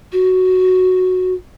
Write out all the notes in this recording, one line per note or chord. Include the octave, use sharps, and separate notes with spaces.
F#4